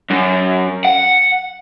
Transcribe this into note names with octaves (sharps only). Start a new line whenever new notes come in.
F#2
F#5